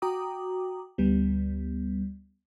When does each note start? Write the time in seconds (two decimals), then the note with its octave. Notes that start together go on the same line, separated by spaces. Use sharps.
0.02 F#4 G5 A#5 D6 D#6
0.98 D2 G3 B3